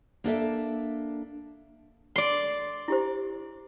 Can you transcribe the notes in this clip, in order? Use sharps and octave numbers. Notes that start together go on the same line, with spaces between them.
A#3 D4 A4 E5
D5 C6
E4 G4 C5